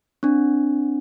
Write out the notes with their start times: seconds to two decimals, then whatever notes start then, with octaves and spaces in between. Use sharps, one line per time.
0.23 C4 D4